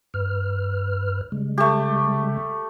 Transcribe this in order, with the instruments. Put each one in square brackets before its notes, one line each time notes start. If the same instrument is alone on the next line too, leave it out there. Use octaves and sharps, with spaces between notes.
[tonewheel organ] G2 B4 F6
C#3 G3 G#3
[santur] A3 G4